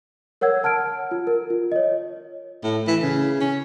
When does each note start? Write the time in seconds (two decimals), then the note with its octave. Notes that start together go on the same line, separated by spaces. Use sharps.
0.41 A#4 C#5 F#5 E6 G#6
0.63 F#5 A5 F6 G#6 D7
1.11 F4
1.27 A#4
1.50 F4
1.72 C#5 D#5
2.64 A2
2.87 E3
3.03 C#3
3.41 C#4